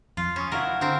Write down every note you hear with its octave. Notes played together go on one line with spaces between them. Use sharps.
F2 F4
C#4 B5 C#6 D#6
E4 F#4 A#4 F5
D3 C4 A#4